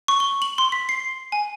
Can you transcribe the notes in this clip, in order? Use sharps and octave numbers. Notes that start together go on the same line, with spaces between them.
C#6
G7
F#7
C6
B6
C7
G#5